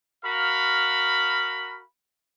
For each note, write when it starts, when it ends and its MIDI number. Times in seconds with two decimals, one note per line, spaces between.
0.24 1.82 66
0.24 1.82 70
0.24 1.82 77
0.24 1.82 83